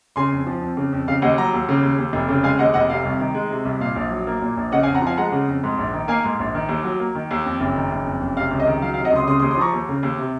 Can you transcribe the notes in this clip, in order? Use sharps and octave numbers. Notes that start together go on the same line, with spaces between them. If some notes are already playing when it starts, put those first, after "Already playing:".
C#3 G#5 C6
F2
F3
F2
C#3
F2
C#3 F5
D#2 D#5 F#5
F#3 F#5 A#5
D#2
C#3
D#2
D#2
F1
C#3
G#3 F5 G#5
D#2 D#5 F#5
F1 D#5 F#5
C3 F5
C2
D#3
G#3
C3
C2
A#2 F5
A#1
F#3
A#3
A#2
A#1
C#3 D#5 F#5
F5 G#5
F2
F#5 A#5
F3 F5 G#5
G#3 F#5 A#5
C#3
F2
G#2
A#1
D#3
A#3 F5 G#5
G#2
A#1
D#3
D#2
F#3
A#3
D#3
D#2
F2
F#1
D#3
F#1
F2
F#1
C3 F5
C#2
D#5
D#3
F#3 F5
F5
C3
D#5 F#5
C#2 C6 D#6
C#3 C6 D#6
C6 D#6
D#2
C6 D#6
F3 A#5 C#6
D#2
C#3
D#2
C3